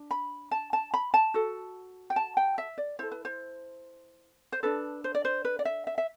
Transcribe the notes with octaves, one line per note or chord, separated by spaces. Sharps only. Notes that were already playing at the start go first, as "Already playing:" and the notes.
Already playing: D4
B5
A5
A5
B5
A5
F#4 A4
G5
A5
G5
E5
D5
E4 A4 C5
B4
C5
C5
D4 A4 B4
C5
D5
C5
B4
D5
E5
E5
E5